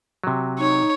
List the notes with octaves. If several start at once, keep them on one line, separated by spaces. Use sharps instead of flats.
C3 F#3
D#4 C#5